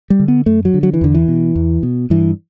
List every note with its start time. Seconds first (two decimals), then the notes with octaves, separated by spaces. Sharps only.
0.10 G3
0.19 D3
0.28 B3
0.46 F#2 A3
0.65 F#3
0.74 D3
0.83 F#3
0.94 E3
1.01 E2 D3
1.15 E3
1.28 B2
1.55 E2
1.83 B2
2.10 G2 E3